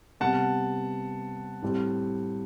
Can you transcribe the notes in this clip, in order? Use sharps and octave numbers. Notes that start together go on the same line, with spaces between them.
C3 G3 B3 F#5 A5
A2 G3 C4